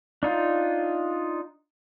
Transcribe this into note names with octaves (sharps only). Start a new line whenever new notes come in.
D4 D#4 F4